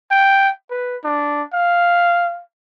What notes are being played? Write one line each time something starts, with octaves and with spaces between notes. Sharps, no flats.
G5
B4
D4
F5